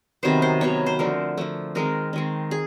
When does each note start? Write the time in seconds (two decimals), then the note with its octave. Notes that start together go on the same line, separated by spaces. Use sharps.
0.23 C3 D#3 F#3 B3 C5
0.42 C5
0.61 C3 D#3 F#3 B3 C#5
0.86 C5
0.99 D3 F3 A3 A#4
1.38 D3 F3 A3
1.75 D#3 G#3 C4 A#4
2.13 D#3 G#3 C4
2.51 G#4